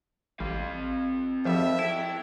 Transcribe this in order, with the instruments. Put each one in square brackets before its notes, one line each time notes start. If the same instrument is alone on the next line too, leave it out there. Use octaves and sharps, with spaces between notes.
[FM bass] A1 [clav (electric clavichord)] G3 [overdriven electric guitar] C4 F5
[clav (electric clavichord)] G#1 F2 G3 [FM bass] F3 [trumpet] E5
[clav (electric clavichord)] E4 [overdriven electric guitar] A4 G5